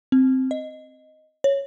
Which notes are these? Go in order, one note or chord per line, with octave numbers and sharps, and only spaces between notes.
C4
D#5
C#5